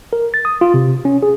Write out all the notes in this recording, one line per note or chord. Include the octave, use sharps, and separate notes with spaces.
A#4
A6
D#6
F4
C3
C#4
G#4